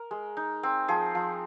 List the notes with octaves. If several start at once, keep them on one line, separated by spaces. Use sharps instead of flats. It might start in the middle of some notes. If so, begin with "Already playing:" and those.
Already playing: A#4
G#3
D#4
C4
F3 G#4
F3